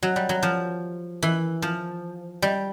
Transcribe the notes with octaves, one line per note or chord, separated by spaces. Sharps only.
F#3
G3
F#3
F3
E3
F3
G3